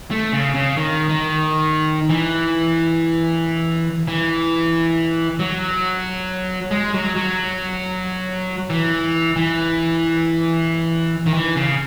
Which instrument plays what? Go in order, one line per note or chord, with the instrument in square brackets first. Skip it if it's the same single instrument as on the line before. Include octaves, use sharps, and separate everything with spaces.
[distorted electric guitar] A3
C#3
C#3
D#3
D#3
E3
E3
F#3
G#3
F#3
F#3
E3
E3
D#3
E3
C#3